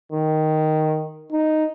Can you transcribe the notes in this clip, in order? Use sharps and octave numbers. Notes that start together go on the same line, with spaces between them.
D#3
D#4